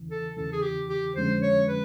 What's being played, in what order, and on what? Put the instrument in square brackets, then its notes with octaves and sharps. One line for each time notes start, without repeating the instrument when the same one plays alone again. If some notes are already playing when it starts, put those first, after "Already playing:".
Already playing: [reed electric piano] E2 C#3 E3
[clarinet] A4
[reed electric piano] E2 C#3 E3 [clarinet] A4
[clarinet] G#4
G4
G4
[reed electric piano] F2 D3 F3 G#3 C#4 [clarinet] C5
[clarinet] C#5
B4